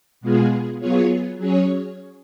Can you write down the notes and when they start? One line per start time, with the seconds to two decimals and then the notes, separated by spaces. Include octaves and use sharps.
0.21 B2 G#3 B3 F4 G#4
0.80 F#3 B3 F4 G#4 C#5
1.38 F#3 C#4 G#4 C#5